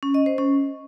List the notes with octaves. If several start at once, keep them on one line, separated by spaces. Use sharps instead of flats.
C#4
D#5
C5
C#4